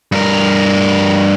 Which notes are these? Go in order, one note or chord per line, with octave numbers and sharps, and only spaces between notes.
G2 A#4